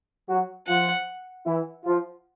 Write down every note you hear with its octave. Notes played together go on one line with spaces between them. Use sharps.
F#3 F#4
F3 F4 F#5
E3 E4
F3 F4